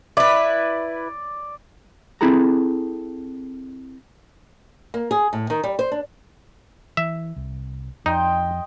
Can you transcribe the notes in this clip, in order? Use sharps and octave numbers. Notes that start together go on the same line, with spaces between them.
E4 B4 D5
C4 E4 G#4 A4 A#5
A#3
G#4
A2
D#3
G3
C5
D4
E3 E5
C2
F2 D#4 D#5 G5 C6